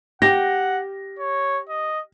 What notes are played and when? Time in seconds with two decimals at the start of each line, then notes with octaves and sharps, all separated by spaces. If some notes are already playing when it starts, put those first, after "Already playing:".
0.22 G4 F#5 A#6
1.19 C#5
1.69 D#5